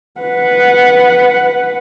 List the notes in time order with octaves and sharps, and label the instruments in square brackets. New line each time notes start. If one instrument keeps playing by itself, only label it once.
[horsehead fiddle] B4 F#5